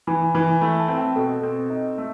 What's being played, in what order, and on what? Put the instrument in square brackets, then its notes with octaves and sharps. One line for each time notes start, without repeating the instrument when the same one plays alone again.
[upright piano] E3 [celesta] B5
[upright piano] E3 [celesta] B5
[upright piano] A3 [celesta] B5
[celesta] A5
[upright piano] C4
[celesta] G5
[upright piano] B2 [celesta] A4
[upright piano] C4 [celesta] A4
[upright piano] D#4
A3